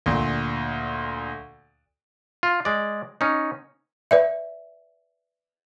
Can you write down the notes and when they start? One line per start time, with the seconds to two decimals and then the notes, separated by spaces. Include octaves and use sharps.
0.06 D2 A#2
2.43 F4
2.65 G#3 D5
3.21 C#4 D#4
4.11 B4 D5 E5